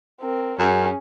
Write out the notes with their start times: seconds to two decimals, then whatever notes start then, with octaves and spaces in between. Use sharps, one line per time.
0.21 C4 A#4
0.59 F#2 C#4 G#4